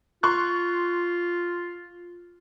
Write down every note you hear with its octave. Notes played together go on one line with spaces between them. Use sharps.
F4 C6 C#6 F#6